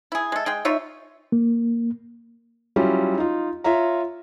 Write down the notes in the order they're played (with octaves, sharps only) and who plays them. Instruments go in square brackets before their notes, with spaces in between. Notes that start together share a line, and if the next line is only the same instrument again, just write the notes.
[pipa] E4 G#4
G#3 A4
G#3 G#4 G5
D#4 F4 C#5 E5
[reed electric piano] A#3
[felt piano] F#3 G3 C#4 E4 F4
D#4 F4
F4 C#5 E5 A#5